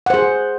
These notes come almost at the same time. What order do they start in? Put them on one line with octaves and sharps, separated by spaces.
F#5 C5 G#4